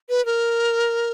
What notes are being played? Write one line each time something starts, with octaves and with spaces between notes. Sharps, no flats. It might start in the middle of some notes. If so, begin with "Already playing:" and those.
B4
A#4